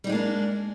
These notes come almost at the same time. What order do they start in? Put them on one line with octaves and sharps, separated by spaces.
G3 D#4 G#3 A#3 D4